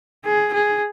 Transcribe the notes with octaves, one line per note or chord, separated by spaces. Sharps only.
G#4
G#4